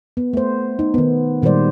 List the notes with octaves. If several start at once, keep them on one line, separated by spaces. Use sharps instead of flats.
B3
A3 C5
D#4
D#3 B3
A#2 D#3 G3 G#3 C5 D5